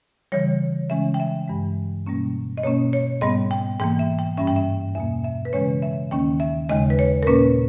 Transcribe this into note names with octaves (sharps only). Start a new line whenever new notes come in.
C#3 E3 G3 C#5
C#3 E3 G#3 C#4 E5
G5
E5
G2 E3 G#3
B2 G3 A#3 C#4
D#5
B2 A#3 C#4 C#5
C#5
G#2 G3 B3 D#5
G5
G#2 E3 A#3 G5
E5
G5
G2 G3 C#4 E5
G5
E5
E2 B2 A#3 E5
E5
B4
C#3 E3 G#3 C#4 C#5
E5
D#2 D#3 A#3 C#4 G5
E5
D#2 C#3 G#3 D#5
B4
C#5
A#4
A#2 A#3 C#4 B4